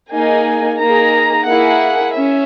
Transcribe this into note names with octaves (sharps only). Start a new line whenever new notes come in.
A#3 D#4 G#4 G#5
A#3 D#4 G#4 A#5
A#3 E4 G#4 F#5
C#4 E5